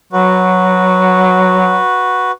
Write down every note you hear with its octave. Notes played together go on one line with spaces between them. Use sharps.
F#3 F#4 B4